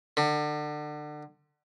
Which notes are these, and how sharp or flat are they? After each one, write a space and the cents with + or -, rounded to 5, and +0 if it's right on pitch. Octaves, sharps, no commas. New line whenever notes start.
D3 +30